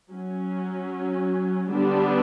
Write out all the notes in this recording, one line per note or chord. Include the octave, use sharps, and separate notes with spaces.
F#3 C#4
D3 G3 B3 D4